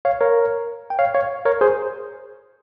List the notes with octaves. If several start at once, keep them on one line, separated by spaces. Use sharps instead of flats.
C#5 F5
A#4 C#5
G5
C#5 F5
C#5 F5
A#4 C#5
G#4 C5